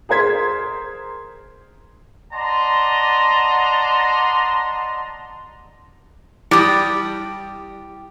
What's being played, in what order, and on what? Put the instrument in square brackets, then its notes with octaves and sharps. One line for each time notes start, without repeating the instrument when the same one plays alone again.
[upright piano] G#4 A#4 C5 G#6 B6
[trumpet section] D5 D#5 F#5 A5 A#5 C6
[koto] G3 [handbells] E4 A6 [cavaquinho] G4 D#6